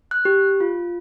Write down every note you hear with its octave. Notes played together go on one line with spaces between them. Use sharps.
F#6
G4
F4